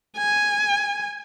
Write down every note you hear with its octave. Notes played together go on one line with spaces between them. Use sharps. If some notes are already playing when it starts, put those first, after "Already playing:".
G#5